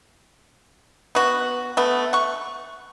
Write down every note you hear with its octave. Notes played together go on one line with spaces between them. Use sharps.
B3 F#4
A3 B3
F#5 C#6